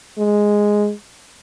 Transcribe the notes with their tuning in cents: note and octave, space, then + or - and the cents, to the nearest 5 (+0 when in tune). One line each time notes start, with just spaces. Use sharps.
G#3 +0